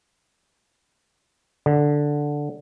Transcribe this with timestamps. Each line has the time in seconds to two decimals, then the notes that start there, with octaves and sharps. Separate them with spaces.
1.66 D3